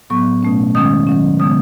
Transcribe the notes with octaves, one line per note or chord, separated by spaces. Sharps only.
A2 F#3 B3 C#6
B2 A3 C#4
D#3 G#3 C#4 D#6
D#3 F#3 C#4
C#3 G#3 B3 D#6